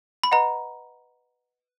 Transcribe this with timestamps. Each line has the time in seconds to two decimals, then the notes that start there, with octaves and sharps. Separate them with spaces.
0.24 B5
0.32 B4 D#5 F#5 A#5